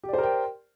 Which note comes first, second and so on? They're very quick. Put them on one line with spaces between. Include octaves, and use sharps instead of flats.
G4 D5 C5 A#4 G5